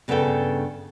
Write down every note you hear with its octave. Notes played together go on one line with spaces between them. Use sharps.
G2 C#3 B3 D4 A4 G5